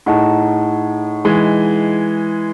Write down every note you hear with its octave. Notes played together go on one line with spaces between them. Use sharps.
A2 D#4 G#4 D#5 F#5 A5
E3 G#3